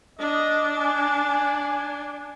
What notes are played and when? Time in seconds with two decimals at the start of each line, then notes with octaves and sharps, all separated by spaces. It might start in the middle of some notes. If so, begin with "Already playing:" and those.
0.19 D4 D#5
0.77 G#5